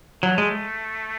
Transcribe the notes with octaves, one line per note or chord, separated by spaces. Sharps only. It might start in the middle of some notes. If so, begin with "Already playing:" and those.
F#3 A3
G#3